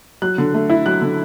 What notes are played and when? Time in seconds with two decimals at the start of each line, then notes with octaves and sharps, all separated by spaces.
0.22 F#3 F#6
0.38 D3
0.54 A3
0.70 E4
0.86 F#3 F#6
1.01 D3